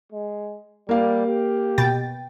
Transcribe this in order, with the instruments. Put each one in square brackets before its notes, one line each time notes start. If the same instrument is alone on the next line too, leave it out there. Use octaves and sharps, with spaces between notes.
[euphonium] G#3
[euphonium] G3 [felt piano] A#3 F5
[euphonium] G4
[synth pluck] B2 G5 A6